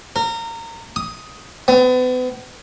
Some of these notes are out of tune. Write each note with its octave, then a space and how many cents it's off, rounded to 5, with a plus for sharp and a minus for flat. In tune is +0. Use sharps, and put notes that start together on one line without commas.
A#4 -25
D#6 +10
B3 +35